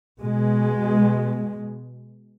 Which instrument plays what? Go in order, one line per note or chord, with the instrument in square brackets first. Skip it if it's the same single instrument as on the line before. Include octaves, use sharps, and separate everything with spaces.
[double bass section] B2 G#3